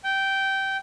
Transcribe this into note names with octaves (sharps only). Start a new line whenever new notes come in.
G5